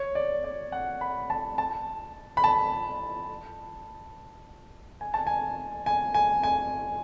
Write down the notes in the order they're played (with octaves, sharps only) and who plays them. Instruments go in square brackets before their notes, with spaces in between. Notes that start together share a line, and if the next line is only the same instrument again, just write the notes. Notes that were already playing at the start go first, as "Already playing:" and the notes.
Already playing: [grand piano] C#5
D5
D5
F#5
B5
A5
A5
B5
A5
G#5
A5
G#5
G#5
G#5
G#5